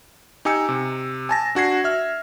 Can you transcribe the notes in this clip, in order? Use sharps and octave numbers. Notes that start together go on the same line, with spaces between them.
D#4 G4 G#5 E6 C#7
C3
G#5 A5 A#6
D4 F#4 G#6 C7
E5 F6